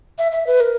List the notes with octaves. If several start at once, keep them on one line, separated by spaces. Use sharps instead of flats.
E5
E5
B4
A#4